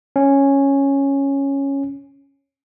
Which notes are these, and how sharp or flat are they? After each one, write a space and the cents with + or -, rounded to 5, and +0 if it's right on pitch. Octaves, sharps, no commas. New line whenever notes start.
C#4 -5